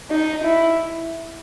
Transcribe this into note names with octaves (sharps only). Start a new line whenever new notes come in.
D#4
E4